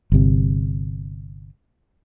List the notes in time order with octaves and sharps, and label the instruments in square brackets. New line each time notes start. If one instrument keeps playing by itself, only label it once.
[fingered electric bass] G1 C3